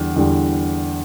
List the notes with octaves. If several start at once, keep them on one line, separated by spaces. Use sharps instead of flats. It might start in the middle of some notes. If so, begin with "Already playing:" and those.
Already playing: E2 D3 G3
E2 D3 G3